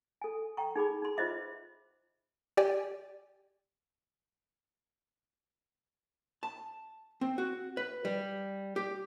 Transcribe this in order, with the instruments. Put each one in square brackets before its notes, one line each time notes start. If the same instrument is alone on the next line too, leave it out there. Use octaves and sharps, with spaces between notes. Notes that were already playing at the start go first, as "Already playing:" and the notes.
[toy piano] A4 G#5
G5 A#5 C#6
D#4 G#4 B5 D6
D#4 C6
F4 B4 C5 D#5 E5 D6
[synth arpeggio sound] G4 D5 G5 G#5
[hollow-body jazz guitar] A5
C4
F#4
B4
G3
G4